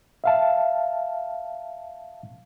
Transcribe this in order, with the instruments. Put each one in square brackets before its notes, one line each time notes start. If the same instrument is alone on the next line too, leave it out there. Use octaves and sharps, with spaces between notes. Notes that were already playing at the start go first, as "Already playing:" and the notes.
[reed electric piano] E5 F5 A5